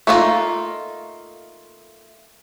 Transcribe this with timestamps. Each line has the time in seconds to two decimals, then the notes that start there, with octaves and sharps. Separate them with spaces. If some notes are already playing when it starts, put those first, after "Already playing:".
0.07 A3 A#3 D#4 F4